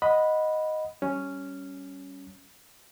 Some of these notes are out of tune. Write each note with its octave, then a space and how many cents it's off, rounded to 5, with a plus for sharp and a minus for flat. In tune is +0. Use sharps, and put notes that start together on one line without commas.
D#5 +0 F#5 -15 B5 +0
G3 -15 C#4 +0